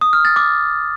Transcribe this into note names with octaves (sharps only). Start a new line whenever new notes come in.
D#6
F6
A6
D6